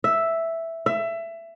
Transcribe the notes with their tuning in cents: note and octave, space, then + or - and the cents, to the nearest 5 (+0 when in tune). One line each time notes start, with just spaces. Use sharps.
E5 +0
E5 +20